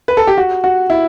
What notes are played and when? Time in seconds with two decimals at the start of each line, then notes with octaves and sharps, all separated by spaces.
0.08 B4
0.17 A4
0.27 G4
0.37 F#4
0.64 F#4
0.90 E4